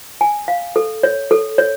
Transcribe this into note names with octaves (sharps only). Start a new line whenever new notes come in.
G#5
F5
A4
C#5
A4
C#5